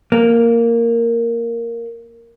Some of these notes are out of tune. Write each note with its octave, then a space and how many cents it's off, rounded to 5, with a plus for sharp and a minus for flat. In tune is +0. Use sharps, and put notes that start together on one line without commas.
A#3 -5